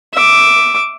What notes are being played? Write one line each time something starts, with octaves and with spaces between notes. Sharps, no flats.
E5 D6